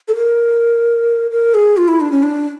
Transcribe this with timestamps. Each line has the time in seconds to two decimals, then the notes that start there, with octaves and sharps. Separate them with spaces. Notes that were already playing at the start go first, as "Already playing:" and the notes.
0.08 A4
0.16 A#4
1.31 A#4
1.54 G#4
1.77 F4
1.88 E4
2.01 D4
2.11 C#4
2.23 D4